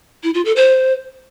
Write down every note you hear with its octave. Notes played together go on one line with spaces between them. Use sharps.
E4
F4
A4
C5